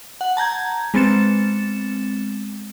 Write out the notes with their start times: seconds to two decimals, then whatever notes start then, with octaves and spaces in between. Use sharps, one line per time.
0.21 F#5
0.37 A5 A#5 G6 G#6
0.94 G#3 B3 C4 A6 C#7 E7